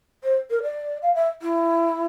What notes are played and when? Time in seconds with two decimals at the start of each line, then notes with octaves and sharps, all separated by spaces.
0.23 C5
0.50 A#4
0.63 D5
1.02 F5
1.15 E5
1.42 E4